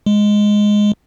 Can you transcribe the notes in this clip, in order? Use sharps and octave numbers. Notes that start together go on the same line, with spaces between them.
G#3